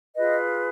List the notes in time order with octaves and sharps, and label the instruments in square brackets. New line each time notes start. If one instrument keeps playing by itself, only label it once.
[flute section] F4 G#4 B4 D#5